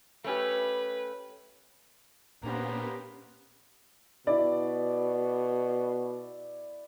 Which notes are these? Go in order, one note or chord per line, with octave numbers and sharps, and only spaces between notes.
A3 C#4 G4 B4
A#2 A#3 B3 C#4 D4 G4 C5 A#5
B2 E4 D5